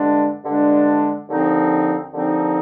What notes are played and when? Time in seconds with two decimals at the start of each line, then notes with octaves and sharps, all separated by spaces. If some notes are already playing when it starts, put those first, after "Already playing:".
Already playing: G2 D3 G#3 D4
0.44 G2 D3 G#3 D4
1.28 D#2 D3 F3 C4 D#4
2.12 D#2 D3 F3 C4 D#4